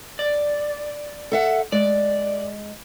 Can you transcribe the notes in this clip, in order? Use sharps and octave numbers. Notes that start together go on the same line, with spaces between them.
D5
A4 E5 F#5
G#3 D5